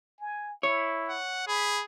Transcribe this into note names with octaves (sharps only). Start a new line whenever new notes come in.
G#5
E4 C#5
F#5
G#4 B5